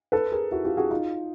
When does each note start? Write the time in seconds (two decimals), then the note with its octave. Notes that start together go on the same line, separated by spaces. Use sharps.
0.12 A4 B4
0.32 G#4 A#4
0.51 E4 F#4
0.64 F4 G4
0.77 F#4 G#4
0.91 D#4 F4